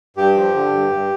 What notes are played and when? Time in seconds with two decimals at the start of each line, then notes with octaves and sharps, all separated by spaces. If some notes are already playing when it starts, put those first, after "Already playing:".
0.17 G2 G4
0.35 F3
0.54 D3
0.72 G2
0.91 G2